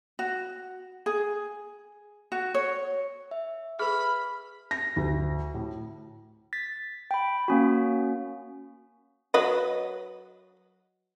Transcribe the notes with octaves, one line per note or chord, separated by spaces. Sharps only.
F#4
G#4
F#4
C#5
E5
G#4 B4 B5 F6
A#6
D2
A2
A6 B6
G5 B5
A#3 C#4 F#4
F#3 B4 D#5